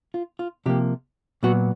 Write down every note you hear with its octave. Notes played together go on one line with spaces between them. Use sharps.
F4
F4
C3 F3 A#3 G4
A#2 F#3 B3 F#4